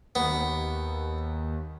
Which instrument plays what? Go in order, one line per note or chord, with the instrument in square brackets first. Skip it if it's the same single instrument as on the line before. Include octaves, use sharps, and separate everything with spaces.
[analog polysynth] D#2 [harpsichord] B3